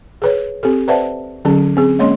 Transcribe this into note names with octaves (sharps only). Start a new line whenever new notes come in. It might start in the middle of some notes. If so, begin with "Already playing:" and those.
G#4 B4 C#5
C4 G4 A4
B4 C5 D5 E5 F#5 A5
D3 F#3 C#4 G#4
C4 G#4
G#3 A#3 C#4 C#5 D#5 C6